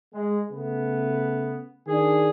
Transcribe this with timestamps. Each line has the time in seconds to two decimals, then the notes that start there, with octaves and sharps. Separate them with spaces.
0.12 G#3
0.50 C#3 A3 B3
1.87 D#3 D4 G#4